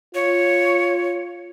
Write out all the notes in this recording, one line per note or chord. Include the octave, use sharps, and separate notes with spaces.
F4 C#5